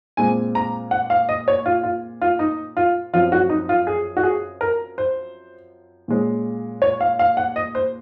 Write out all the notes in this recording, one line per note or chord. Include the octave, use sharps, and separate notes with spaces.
A#2 G#3 C4 G#5
A#5
F#5
F5
D#5
C#5
F4
F4
F4
D#4
F4
F#2 F3 C4 F4
F#4
D#4
F4
G#4
F#4
G#4
A#4
C5
A#2 G#3 C#4
C#5
F5
F5
F#5
D#5
C5